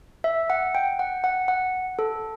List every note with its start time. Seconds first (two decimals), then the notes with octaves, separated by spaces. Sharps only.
0.24 E5
0.50 F#5
0.75 G5
0.99 F#5
1.24 F#5
1.48 F#5
1.99 A4